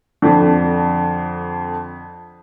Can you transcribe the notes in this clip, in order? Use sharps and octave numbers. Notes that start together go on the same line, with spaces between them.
F2 D3